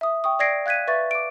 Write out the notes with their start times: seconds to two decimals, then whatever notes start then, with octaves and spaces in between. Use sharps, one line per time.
0.01 E5 D#6
0.24 G5 C#6 D#6
0.39 D5 E6 G#6 A#6 C7 D7
0.66 F5 F#6 G#6 B6 D#7
0.87 B4 E5 C#6 A6
1.11 D6 D7